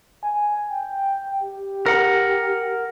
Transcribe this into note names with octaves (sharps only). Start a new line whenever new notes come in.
G#5
G5
G4
A#4 F#5